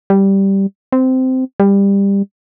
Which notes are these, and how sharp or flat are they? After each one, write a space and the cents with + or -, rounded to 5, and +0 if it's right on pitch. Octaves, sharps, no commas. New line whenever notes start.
G3 -5
C4 -15
G3 +20